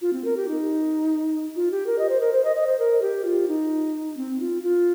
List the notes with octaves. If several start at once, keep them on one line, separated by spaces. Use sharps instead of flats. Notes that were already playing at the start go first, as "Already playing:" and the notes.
F4
C4
A#4
G4
D#4
F4
G4
A#4
D#5
C5
A#4
C5
D#5
D#5
C5
A#4
G4
F4
D#4
C4
F4
F4